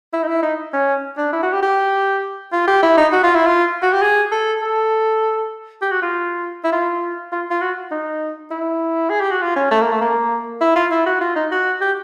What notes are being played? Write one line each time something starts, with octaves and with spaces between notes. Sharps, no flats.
E4
D#4
E4
D#4
C#4
D4
E4
F#4
G4
G4
F4
G4
E4
D#4
F#4
F4
E4
F4
F#4
G4
G#4
A4
A4
G4
F#4
F4
E4
F4
F4
F4
F#4
D#4
E4
G#4
G4
F#4
F4
C#4
A3
A#3
A3
A#3
E4
F4
E4
F#4
F4
D#4
F#4
G4